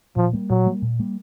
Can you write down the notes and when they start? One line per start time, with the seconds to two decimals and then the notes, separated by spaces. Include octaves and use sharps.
0.16 A#2 F3
0.33 G3 A#3
0.50 A#2 F#3
0.66 G3 A#3
0.82 A#2
0.99 G3 A#3